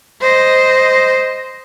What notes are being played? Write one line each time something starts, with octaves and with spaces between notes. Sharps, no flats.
C5 D#5